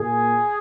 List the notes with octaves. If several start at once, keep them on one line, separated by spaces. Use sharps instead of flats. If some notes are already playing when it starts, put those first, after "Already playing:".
Already playing: A#2 G#4